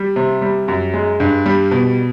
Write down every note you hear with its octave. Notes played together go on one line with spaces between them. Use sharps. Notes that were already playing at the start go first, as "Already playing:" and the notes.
Already playing: G3
C3
G3
F#2
G#3
G2
G3
B2